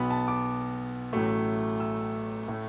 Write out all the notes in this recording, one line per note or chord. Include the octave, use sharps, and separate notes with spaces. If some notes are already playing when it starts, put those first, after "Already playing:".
Already playing: B1 B2 B3 B5
A5
D6
A1 A2 F#3 A3
E6
A2 A3